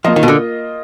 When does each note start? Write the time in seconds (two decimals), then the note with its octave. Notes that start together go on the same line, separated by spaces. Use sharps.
0.04 F3 A#3 F4 A#4 D#5
0.16 D#3
0.23 B2
0.28 D3